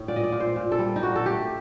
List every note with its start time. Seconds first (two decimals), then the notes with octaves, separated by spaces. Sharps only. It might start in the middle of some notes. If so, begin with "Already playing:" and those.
Already playing: A2
0.08 A#2 D5
0.16 D#5
0.24 D5
0.32 A#2
0.40 C5
0.56 A#2
0.72 A4
0.79 G3
0.96 D#4
1.03 A#2 F#4
1.16 A4
1.26 A3 G4